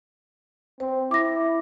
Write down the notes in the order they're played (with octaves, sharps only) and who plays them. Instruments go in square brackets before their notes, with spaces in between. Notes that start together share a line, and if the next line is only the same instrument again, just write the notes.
[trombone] C4 [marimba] C5
[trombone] E4 [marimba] D6 A#6